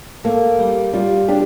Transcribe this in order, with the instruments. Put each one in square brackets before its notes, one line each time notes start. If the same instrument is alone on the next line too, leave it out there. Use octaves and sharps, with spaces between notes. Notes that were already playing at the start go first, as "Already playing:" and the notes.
[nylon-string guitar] A#3 [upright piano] A4
[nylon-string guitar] G3
[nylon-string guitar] G3 [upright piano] F4
[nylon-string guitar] D4 [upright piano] G4